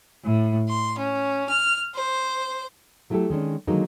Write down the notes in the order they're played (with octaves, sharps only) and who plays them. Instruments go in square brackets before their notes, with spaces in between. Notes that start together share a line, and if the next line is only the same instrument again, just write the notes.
[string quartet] A2
C6
C#4
F6
C5
[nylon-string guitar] F#3 A3 E4 F#4 G4 A4
D#3 G#3 C#4 D4
D3 D#3 F#3 G#3 A#3 D#4